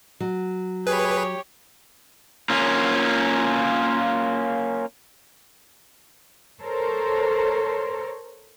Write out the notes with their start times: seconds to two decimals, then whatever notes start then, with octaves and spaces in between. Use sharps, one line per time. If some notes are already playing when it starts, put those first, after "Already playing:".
0.20 F#3
0.87 G4 G#4 B4 C#5
2.50 A#3 C#4 F4
6.62 A4 A#4 C5 C#5